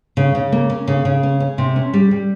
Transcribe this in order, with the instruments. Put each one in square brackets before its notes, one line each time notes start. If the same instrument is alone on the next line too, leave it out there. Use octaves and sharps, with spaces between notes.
[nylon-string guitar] C#3
C#3
A#3
C#4
C#3
C#3
C#4
C#4
C3
C#4
G3
G3